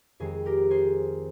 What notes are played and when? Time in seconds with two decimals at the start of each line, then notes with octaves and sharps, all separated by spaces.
0.20 F2 D#3 G#3 C4 G#4
0.46 G4 A#4
0.70 G#4 C5